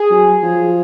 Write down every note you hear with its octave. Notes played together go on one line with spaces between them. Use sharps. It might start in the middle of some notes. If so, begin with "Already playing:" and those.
Already playing: G#4
F#3
F3